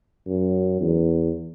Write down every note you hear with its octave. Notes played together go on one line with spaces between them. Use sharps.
F#2
E2